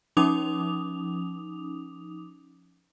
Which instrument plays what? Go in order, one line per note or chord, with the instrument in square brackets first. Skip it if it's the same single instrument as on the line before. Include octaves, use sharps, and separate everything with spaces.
[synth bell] F3 C#4 D#4 D6 D#6 F7